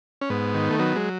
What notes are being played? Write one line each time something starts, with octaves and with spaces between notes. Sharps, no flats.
C#4
G#2 B3
D#3
A3
F#3 B3
G#3